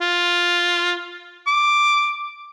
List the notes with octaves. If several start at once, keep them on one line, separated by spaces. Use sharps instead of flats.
F4
D6